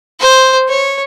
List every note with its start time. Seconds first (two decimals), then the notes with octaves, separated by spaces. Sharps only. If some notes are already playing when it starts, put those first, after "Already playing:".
0.20 C5
0.68 C#5